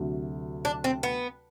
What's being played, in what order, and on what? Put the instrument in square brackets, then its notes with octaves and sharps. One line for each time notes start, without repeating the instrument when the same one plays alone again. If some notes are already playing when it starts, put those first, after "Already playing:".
Already playing: [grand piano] D2 C3 F#3
[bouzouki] D4
C4
B3